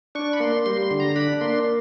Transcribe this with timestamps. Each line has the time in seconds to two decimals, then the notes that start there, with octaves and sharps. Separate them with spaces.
0.15 D4 C#6
0.33 B5
0.40 A#3 C6
0.66 G3 C6
0.83 C6
0.91 D3
1.00 A#5
1.16 D4 B5
1.41 A#3 C6